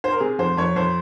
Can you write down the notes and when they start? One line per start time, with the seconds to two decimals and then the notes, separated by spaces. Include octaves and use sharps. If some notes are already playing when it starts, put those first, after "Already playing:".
0.04 C5
0.12 A#4
0.20 C3 G#4
0.39 F2 C5
0.57 F2 C#5
0.76 F2 C5